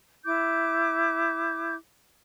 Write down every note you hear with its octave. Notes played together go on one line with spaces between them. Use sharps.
E4 D6 G6